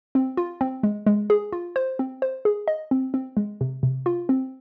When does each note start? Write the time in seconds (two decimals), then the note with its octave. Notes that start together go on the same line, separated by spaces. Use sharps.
0.15 C4
0.37 F4
0.61 C4
0.83 G#3
1.06 G#3
1.30 G#4
1.52 F4
1.76 C5
1.99 C4
2.22 C5
2.45 G#4
2.68 D#5
2.91 C4
3.14 C4
3.37 G#3
3.61 C3
3.83 C3
4.06 F4
4.29 C4